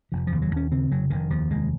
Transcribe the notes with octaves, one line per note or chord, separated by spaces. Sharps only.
F1 F3
F3
D#2
F#3
D#2 C#4
C#3 C4
F1 F#3
F1 D#3
D#2 F3
F1 G#3